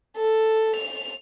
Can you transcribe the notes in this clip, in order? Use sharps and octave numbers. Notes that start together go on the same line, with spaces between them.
A4
F7